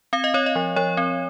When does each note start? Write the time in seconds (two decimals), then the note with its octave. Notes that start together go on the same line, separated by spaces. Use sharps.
0.13 C4 F5
0.24 D#5
0.34 C4 C#5
0.46 D#5
0.56 F3
0.76 F3 C#5
0.97 C4